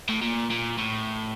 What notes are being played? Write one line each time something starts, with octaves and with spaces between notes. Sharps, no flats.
A2
A#2
A#2
A2